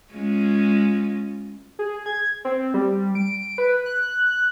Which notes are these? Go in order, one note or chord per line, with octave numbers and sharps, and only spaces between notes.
G#3 C#4 F4
G#4
G#6
C4
G3
D7
B4
F#6